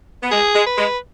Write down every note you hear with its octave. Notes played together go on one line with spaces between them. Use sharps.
B3
G#3 G#4
G#3
B4
G#3